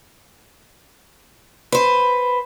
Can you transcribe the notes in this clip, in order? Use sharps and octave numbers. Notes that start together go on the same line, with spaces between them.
B4 C5